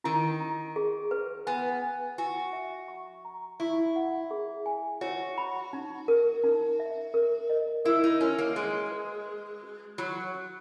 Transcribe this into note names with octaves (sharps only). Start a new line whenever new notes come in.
D#3 E4
E4
G#4
B4
B3 G#5
G#5
F#4 G#5
E5
C#6
A#5
E4 C#6
F#5
G#4
G#5
F#4 C#5
B5
D#4
A#4
D#4
E5
A#4
D#5
E4 A#4
D#4
C#4 F#4
A#3
G#3 G#5
B4
B4
F#4
F#3 B5
F#4